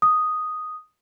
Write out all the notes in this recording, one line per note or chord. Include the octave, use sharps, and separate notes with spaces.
D#6